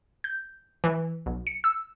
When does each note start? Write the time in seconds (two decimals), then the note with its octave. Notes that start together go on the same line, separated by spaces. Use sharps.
0.24 G6
0.84 E3
1.26 B1
1.47 C#7
1.64 E6